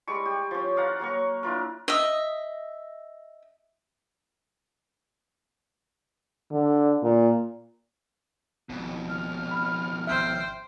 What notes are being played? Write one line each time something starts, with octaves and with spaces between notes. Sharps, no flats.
G3 G#3 C#6
G4
F3 C#4
D5 F5 F#5 A#5
F#3 A#3 A#4 C#6
D4 E4 F4 A#4
D#5 E5
D3
A#2
G#1 F2 B2
F6
B5
G#1 C5 E5 G5